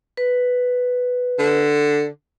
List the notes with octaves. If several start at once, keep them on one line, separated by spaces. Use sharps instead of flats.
B4
D3